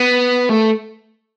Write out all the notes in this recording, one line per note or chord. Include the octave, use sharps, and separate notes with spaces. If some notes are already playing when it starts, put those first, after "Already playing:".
Already playing: B3
A3